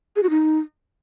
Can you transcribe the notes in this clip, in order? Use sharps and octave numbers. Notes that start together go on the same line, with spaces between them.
G#4
F#4
D#4